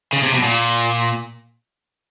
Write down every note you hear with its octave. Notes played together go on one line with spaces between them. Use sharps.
C#3
C3
B2
A#2